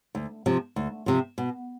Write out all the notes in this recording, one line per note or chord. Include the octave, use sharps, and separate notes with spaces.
D2
C3 F3
D2
C3 F3
B2